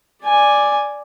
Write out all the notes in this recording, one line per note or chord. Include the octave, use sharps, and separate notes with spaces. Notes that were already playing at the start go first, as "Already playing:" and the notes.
D5 G#5